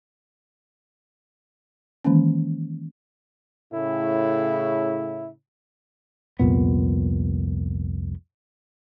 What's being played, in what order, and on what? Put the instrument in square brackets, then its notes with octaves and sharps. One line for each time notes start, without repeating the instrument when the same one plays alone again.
[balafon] D#3 E3 G#3 A#3 C#4
[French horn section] A2 C#3 [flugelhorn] E4
[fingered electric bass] C2 F2 A#2 B3